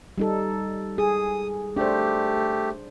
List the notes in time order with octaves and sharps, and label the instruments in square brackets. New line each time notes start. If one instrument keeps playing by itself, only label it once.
[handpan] G3 D#4 A4
[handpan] G#4 [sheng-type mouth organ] D#6
[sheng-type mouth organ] A3 G4 [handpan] D4 C5